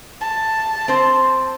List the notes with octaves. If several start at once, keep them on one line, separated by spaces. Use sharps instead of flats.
A5
C4 C5